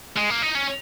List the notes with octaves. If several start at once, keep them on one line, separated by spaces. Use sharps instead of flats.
G#3
A#3
D#4
C#4